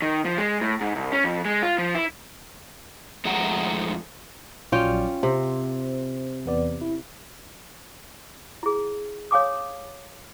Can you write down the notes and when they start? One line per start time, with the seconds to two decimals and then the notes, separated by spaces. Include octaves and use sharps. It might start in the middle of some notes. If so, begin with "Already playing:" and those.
0.02 D#3
0.25 F3
0.38 G#3
0.61 A2
0.81 G#2
0.96 C2
1.12 C#4
1.24 F2
1.45 G#3
1.62 F4
1.78 F3
1.95 E4
3.25 F2 G#3 A3 F#5 A#5
4.72 A#1 F#3 C#4 F4 D5 G5
5.23 C3 C5
6.46 E2 B3 D5
6.81 E4
8.63 E4 G#4
9.31 C#5 F5 G#5 D6 D#6